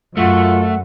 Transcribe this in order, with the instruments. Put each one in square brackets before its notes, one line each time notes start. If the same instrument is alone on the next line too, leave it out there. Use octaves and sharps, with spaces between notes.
[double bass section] F#2 [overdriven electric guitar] A3 [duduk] F4 [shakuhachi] F#5